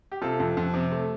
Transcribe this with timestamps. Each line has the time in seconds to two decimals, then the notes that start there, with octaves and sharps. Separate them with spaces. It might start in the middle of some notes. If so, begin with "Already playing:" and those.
0.12 G4
0.22 C3 F4 A4
0.40 F2
0.57 F2
0.74 C3
0.92 A3